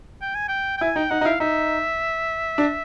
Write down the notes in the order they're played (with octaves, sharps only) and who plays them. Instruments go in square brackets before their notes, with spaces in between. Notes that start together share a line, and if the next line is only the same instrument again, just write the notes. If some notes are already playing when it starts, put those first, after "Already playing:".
[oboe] G5
G#5
G5
G5
[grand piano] E4 [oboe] G#5
[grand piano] D#4 [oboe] G5
[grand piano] D#4 [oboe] F#5
[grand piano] D#4
[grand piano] E4 [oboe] F5
[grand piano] D#4 [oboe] E5
[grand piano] D4